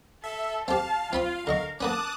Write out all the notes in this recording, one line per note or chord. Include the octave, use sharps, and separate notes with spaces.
A4 E5
C4 G4 F5 A5
C4 F4 B5 C6
D3 A#4 D#5 C#6
A#3 B3 C#4 A5 D6 D#6 F#6